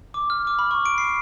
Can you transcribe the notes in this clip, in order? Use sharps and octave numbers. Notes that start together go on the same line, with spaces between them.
D6
F6
D6
B5
C#6
D7
C7